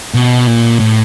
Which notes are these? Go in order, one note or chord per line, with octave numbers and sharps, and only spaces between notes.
B2
A#2
A2